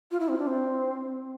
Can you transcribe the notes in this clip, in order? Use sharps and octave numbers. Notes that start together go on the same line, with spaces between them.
F4
E4
C4
D4
C4